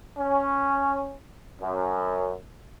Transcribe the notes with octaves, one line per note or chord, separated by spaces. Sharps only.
C#4
F#2